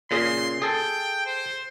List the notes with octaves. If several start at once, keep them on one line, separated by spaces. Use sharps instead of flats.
A#2 C#3 G#4 C6
G#4 A4 G5 G#5
C5